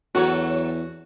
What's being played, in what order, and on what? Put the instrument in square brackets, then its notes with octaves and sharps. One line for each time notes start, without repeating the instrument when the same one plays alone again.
[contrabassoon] E2 [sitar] F#3 A4 C#5 [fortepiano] F#4